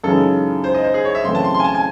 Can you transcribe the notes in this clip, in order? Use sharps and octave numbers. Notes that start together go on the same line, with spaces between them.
F#2 C#3 E3 G#3 D#4 A4
C5
D#5
C5
G#4
C#5
E5
F#2 C#3 E3 A3 C4 C6
A5
C6
C6
G#5
A5
G#5